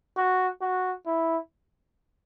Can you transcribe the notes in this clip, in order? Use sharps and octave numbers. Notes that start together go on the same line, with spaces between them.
F#4
F#4
E4